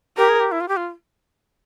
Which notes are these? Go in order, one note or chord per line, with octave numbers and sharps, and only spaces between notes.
G4 A#4
G#4
G4
E4
F4
G4
F4